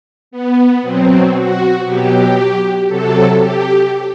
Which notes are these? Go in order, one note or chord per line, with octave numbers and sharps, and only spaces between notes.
B3
B2 F#3 C4
F#4
B2 F#3 G4
C3 F#3 A4
G4